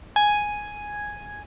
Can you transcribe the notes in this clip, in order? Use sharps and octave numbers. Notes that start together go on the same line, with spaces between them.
G#5